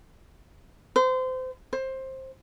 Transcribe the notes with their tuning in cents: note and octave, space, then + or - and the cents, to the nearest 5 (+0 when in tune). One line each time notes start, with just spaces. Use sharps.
C5 -30
C5 +15